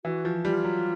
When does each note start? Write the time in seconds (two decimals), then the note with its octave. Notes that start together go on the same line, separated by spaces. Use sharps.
0.05 E3 F#4
0.25 F3
0.45 G3 F4
0.64 F#3